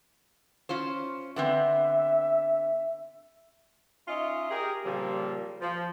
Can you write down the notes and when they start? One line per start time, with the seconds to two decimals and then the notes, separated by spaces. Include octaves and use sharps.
0.69 C#4 F4 C5
1.36 D3 B3 C4 E5
4.08 C#4 D#4 F4 D#5 E5
4.51 G4 G#4 A#4
4.85 A#2 C#3 F3 G3 A#3 C4
5.61 F3